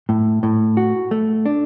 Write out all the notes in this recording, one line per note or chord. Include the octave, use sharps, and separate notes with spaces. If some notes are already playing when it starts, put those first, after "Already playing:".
A2
A2
F#4
A3
D4